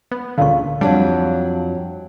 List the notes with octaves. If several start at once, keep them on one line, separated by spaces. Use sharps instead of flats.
B3
C#2 A#2 D3 F5 C#6
F2 F#3 G3 D4